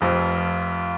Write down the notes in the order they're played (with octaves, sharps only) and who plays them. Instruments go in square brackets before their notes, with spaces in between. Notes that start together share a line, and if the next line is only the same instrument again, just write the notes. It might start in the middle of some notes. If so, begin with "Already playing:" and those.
[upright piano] F1 F2 F3 [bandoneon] F4